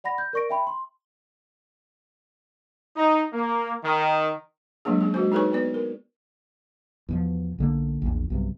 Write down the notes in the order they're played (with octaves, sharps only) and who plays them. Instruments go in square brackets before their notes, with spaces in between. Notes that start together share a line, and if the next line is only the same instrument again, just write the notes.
[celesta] D5 F#5 B5 A#6
G6
A#4 D5 C#6 A#6 D7
E5 G5 B5
C6
[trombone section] D#4
A#3
D#3
[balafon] F#3 G#3 A#3 D4 G#4
C#4 G#4
G#3 F#4 C5
D#4 G#4 A4 B4 C#5 C#6
B3 B4 D5
A#4
[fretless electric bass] E2 B2 F3
B1 D3 A#3
A#1 E2
B1 G2 C3